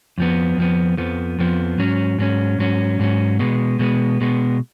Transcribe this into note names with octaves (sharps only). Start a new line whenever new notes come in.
F2 F3 B3
F2 F3 B3
F2 F3 B3
F2 F3 B3
G#2 F#3 C#4
G#2 F#3 C#4
G#2 F#3 C#4
G#2 F#3 C#4
B2 G#3 B3
B2 G#3 B3
B2 G#3 B3